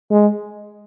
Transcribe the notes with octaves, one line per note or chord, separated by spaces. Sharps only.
G#3